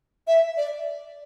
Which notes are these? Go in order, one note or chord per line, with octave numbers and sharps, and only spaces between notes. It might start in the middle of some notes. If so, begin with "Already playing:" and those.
E5
D5